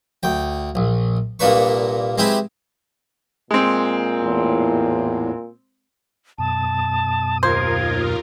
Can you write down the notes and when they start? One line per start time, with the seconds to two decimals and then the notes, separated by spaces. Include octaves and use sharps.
0.23 D2 G5
0.75 A#1
1.40 C2 A#2 A#3 D4 B4 C#6
2.18 G#3 C4 E4 G4 B4
3.51 A#2 G#3 C4
4.17 E2 A2
6.38 F#2 B2 A5 D#6
7.43 D#2 F4 A#4 C5 G#6